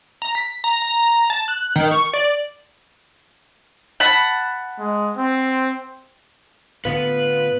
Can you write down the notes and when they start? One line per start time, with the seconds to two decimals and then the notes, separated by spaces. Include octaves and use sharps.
0.22 A#5
0.35 B6
0.64 A#5
0.82 A#5
1.30 A5
1.48 F#6
1.76 D#3
1.91 C#6
2.13 D5
4.00 F#5 A5 B5
4.79 G#3
5.18 C4
6.85 A2 D3 B3 F4 B4